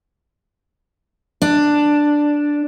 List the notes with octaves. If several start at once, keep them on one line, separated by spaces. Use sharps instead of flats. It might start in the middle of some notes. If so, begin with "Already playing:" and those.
D4